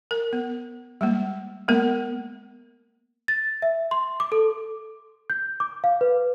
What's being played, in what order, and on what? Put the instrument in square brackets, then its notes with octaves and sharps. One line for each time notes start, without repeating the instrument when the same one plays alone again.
[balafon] A#4
B3
G3 G#3 A#3
G#3 A#3 B3 A#4
[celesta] A6
E5
C6
D6
A4
G6
D6
F5
B4